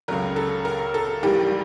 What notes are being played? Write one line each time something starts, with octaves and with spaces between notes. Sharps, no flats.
C#2 C#3 F#3 A3 A#4
A4
A#4
A4
A#1 G#2 E3 G3 A#3 G4